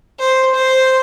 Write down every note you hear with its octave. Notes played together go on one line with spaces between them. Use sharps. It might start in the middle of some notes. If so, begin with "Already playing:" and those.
C5
C5